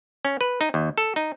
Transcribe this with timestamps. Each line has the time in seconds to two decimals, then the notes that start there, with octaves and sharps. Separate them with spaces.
0.25 C#4
0.41 B4
0.61 D#4
0.74 D#2
0.98 A4
1.16 D#4